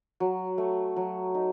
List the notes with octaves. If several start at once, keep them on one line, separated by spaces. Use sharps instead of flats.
F#3
A3
F#3
D#4